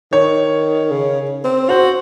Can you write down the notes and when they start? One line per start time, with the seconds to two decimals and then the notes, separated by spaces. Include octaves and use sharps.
0.12 D#3 C#5
0.91 C#3
1.44 C4
1.70 F#4 C5